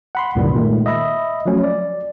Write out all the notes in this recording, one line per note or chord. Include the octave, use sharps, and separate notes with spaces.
F#5 B5 C6
C2 F#2 A#2 D#3 E3 G3
A#2 D#3 G#3 A3
D#5 E5 B5
F3 F#3 A3 C#4
D5